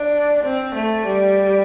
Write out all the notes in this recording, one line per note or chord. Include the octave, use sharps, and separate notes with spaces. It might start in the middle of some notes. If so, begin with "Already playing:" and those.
Already playing: D4
C4
A3
G3